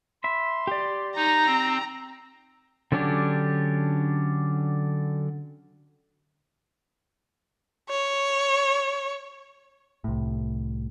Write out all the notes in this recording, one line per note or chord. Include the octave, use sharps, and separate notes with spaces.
E5 B5 C6
G4 D5
D#4 A#5
C4
D3 F#3 C#4 D4 G4
C#5
C2 A2